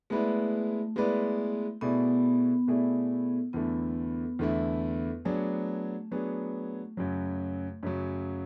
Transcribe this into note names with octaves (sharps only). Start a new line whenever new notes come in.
G#3 A3 B3 E4 B4 D5
G#3 B3 E4 B4 D5
B2 A3 B3 E4 G#4 D5
B2 A3 E4 G#4 D5
E2 D3 A3 B3 E4
E2 D3 A3 E4
F#3 A3 B3 D4 G#4
F#3 B3 D4 G#4
F#2 C#3 F#3
F#2 C#3 F#3